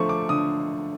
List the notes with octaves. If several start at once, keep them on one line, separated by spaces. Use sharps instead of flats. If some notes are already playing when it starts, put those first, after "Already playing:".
Already playing: D3 F3 A3 C6 C#6
D6
D3 D#6